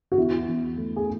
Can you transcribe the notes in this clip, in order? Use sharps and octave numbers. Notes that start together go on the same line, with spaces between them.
F#4
E2 E4
E2
A3
G#4